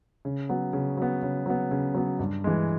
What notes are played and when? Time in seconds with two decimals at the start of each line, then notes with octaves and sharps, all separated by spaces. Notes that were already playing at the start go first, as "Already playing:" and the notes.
0.25 C#3
0.49 F#3 B3
0.73 C#3
0.97 F#3 B3
1.23 C#3
1.46 F#3 B3
1.71 C#3
1.94 F#3 B3
2.19 G2
2.44 E3 G#3